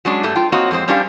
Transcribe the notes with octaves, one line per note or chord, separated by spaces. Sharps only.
F#3 G#3 C#4 D4
G2 G3 A3
F4 G5
A#3 C4 F#4 C#5 D#5
F2 G#3 C4 C5
G3 C#4 D4 G4 C5 F5